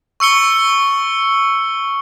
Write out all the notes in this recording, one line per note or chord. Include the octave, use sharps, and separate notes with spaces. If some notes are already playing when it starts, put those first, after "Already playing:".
C#6 E6 C#7 G7